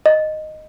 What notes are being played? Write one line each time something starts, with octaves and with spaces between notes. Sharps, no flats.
D#5